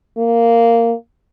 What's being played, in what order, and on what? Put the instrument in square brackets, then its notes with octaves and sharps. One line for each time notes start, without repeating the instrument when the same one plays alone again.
[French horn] A#3